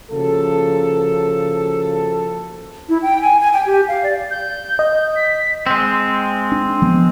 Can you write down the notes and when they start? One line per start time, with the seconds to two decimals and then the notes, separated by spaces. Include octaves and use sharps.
0.11 C#3 F3 A#3 F#4 A4
2.89 E4
3.02 G5
3.21 G#5
3.40 G#5
3.53 G5
3.66 G4
3.88 F5
4.03 D5
4.30 G6
4.79 D#5
5.15 B6
5.67 G#3 C4
6.52 D4
6.82 F3 B3